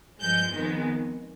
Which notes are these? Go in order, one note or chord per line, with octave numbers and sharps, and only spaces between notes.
G2 F3 G#3 G6
F2 D#3 G#3 B3